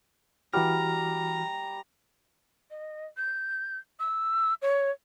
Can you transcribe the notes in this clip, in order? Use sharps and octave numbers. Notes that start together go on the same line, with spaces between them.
E3 G3 F#4 A#5 F6
D#5
G6
E6
C#5